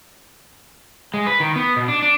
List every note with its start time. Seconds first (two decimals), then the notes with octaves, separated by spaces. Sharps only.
1.14 G#3
1.26 B4
1.40 D#3
1.56 B3
1.76 B2
1.88 D4
2.02 D4